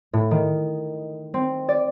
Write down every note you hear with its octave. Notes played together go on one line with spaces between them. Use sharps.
A2
D#3
C4
D5